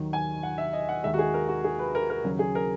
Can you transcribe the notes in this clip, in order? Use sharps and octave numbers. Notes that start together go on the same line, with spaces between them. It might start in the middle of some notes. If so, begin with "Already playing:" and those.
Already playing: D#2 D#3 F#3
G#5
F#5
E5
D#5
F#5
D#2 D#3 G#3 E5
F#4
G#4
A#4
F#4
G#4
B4
A#4
A#4
D#2 C#3 F#3
G#4
A#4